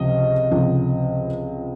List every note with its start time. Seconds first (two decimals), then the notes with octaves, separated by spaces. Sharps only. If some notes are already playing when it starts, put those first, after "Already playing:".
Already playing: C#2 C3 F3 D#5
0.51 C#2 C3 F3